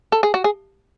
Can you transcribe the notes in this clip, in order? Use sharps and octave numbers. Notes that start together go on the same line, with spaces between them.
A4
G#4
F#4
G#4